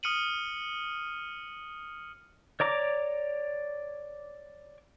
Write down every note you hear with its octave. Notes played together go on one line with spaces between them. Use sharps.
D#6 F6 C#7 D#7 F#7
C#5 D5 A#5 D6